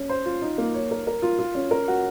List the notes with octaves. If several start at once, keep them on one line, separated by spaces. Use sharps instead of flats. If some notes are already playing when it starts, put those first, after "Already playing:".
Already playing: C#4
C5
F4
D#4
A#3
C#5
A#4
A#4
F4
F4
C#4
A#4
F#4